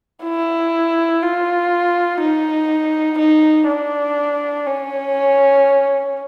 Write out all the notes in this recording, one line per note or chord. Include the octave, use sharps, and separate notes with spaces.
E4
F4
D#4
D#4
D4
C#4